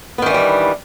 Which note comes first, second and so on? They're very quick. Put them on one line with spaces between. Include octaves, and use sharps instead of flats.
B3 D#3 E3 D4 G3